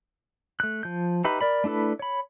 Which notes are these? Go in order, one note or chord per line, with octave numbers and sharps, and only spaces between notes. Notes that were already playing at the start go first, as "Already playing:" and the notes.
A3 F#6
F3 G6
D#4 G4 B4 E5 B5
A#4 D5 B5
A3 D4 E4 A4 B4
C#5 B5